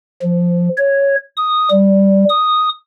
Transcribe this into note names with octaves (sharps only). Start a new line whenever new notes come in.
F3
C#5
D#6
G3
D#6